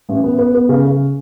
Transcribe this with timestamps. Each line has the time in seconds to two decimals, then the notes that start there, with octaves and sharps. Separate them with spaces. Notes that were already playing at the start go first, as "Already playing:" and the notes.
0.09 A1
0.24 B3
0.38 B3
0.55 B3
0.69 C#3
0.85 C#3